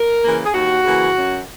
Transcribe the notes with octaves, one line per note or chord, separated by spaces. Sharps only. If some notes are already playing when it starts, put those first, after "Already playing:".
Already playing: A#4
C#3 E3 A#3
G#4
D#2 F#4
C#3 E3 A#3
F#2